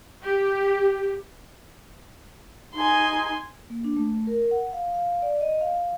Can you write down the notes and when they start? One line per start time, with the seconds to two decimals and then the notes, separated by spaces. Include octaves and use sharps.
0.23 G4
2.74 D#4 G#5 C6
3.70 A#3
3.84 D4
3.97 A3
4.27 A#4
4.51 F#5
4.73 F5
4.94 F5
5.22 D5
5.41 D#5
5.61 F5
5.77 F5